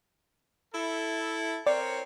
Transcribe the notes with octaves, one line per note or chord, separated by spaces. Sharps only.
E4 A4
C4 A#4 C#5 D5